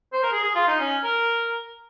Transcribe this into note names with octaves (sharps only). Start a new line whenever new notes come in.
C5
A#4
G#4
G#4
F4
D#4
C#4
A#4